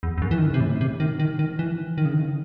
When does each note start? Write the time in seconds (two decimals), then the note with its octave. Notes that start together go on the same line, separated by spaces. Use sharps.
0.03 E2
0.18 E2
0.22 F#2
0.31 E3
0.38 D#3
0.47 C#3
0.54 C3
0.61 A2
0.81 C3
1.00 D#3
1.19 D#3
1.39 D#3
1.59 E3
1.98 D#3
2.05 C#3
2.14 D#3